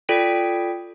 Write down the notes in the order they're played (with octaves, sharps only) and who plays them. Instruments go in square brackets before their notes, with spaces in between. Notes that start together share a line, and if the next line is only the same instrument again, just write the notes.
[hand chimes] F4 A4 D5 G5 B6 D7